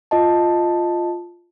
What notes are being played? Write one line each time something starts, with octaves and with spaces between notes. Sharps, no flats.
F4 D#5 A5